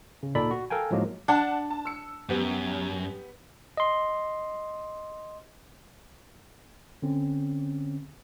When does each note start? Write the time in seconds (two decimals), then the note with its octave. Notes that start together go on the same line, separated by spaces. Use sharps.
0.23 C#3
0.35 A#2 D#4 A4 D5 B5
0.51 F#4
0.70 A4 A#4 F5 G5 G#5
0.91 A2 F3 F#3 G#3 A#3 D#4
1.28 D4 D5 F#5 A5
1.70 A5
1.85 E6 C#7
2.29 F#2 B3 G4
3.77 D#5 C6
7.02 D3 C4 C#4